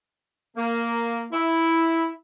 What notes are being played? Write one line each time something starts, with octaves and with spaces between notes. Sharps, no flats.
A#3
E4